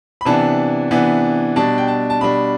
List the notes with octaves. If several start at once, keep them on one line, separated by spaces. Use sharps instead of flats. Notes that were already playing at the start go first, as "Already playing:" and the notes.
B5
C3 E3 B3 D4 A5
C3 E3 B3 D4
B2 G3 D4 A5
G5
A5
A5
B2 G3 D4 B5